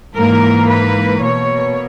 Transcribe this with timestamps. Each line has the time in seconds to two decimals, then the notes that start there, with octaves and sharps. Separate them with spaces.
0.16 G#2 E3 A#3 A#4
0.69 B4
1.22 B2 A#3 C#5